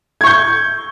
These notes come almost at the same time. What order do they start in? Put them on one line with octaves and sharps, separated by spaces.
G#6 C#6 G6